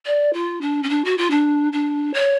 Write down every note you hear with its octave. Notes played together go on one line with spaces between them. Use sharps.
D5
F4
D4
C#4
D4
F#4
F4
D4
D4
C#5